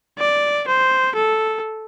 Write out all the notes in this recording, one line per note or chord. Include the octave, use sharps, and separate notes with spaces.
D5
C5
A4